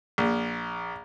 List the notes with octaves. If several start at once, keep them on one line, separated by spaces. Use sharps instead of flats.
A#1